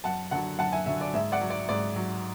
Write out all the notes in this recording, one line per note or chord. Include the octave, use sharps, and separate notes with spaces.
F#2 F#5 A5
D3 F#3 F#5 A5
F#2 F#5 A5
E5 G#5
D3 F#3 E5
D5
G#2 E5
D5 F#5
F#3
D5
G#2 D5
F#3